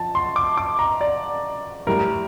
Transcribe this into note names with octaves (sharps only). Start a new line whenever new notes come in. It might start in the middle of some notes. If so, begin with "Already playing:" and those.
Already playing: F3 A5
C6
D6
D6
A#5
D5
A2 G3 A#4